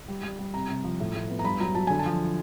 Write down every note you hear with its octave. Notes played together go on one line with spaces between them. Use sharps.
G3
G3
G3
C3 A#5
C3
F3
A2
A2
B3
A#5
G2 B5
F#3 A#5
F#3 A5
D3 G#5
A5
F3